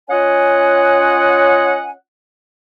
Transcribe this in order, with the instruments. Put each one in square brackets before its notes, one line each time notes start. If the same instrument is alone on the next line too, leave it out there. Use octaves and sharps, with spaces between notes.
[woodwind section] C#4 F4 C#5 D#5 F#5 G#5